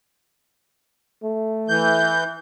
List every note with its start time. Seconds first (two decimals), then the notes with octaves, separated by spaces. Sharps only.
1.23 A3
1.68 E3 G6